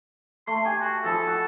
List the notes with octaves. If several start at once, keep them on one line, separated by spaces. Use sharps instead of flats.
A3 C6
G4 G#5
F#4
F3 G#4 A4 B5
F#4